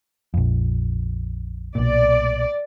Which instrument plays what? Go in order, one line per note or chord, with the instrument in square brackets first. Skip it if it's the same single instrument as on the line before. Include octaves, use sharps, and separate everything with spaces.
[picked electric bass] A#1 F2
[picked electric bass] B1 A#2 [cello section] D5